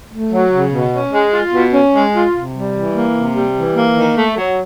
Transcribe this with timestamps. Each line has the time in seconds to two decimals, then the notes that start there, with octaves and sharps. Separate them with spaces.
0.11 A3
0.31 F#3
0.51 C#3
0.72 B2
0.92 C#4
1.12 G#3
1.32 F4
1.53 B2
1.73 C#4
1.94 G#3
2.14 F4
2.35 C3
2.54 G3
2.75 E3
2.95 A#3
3.16 C3
3.35 G3
3.56 E3
3.76 A#3
3.96 D#3
4.17 A3
4.38 F#3